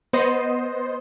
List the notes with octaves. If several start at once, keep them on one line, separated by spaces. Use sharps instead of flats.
B3 C5 D#5